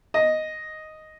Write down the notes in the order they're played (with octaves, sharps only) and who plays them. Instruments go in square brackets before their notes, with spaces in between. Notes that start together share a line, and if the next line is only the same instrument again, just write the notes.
[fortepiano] D#5